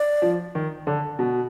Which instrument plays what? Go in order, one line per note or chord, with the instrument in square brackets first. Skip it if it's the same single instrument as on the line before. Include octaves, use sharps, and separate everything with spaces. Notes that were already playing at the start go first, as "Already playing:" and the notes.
Already playing: [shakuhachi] D5
[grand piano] F3
D#3
D3
B2